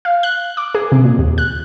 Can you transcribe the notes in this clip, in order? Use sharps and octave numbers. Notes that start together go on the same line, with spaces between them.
F5
F#6
D6
G#4
C3
A#2
D#2
F#6